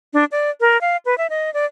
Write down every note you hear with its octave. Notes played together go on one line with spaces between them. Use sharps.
D4
D5
A#4
F5
B4
E5
D#5
D5